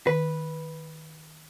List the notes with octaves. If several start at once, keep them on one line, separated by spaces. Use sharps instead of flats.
D#3 B4